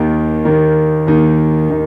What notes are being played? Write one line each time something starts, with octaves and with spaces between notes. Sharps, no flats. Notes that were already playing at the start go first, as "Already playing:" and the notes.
Already playing: D#2 D#3 A#3 D#4
D#2 D#3 A#3 D#4
D#2 D#3 A#3 D#4
D#3 A#3 D#4